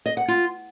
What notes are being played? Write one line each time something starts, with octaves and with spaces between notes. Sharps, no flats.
D#5
F#5
F4